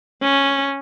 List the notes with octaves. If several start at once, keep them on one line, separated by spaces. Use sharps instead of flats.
C#4